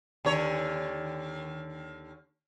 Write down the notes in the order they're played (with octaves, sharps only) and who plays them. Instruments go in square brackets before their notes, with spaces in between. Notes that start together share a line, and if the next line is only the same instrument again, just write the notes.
[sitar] D#2 D3 C#5